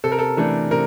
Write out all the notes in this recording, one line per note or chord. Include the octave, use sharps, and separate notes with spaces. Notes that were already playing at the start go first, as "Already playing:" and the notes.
C3 A4
A#4
A4
E3 A3 D4 A4
C3 A#4